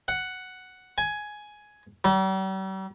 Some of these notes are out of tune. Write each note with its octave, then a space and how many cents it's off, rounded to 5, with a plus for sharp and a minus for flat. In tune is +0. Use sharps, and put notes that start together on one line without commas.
F#5 +5
G#5 +10
G3 -45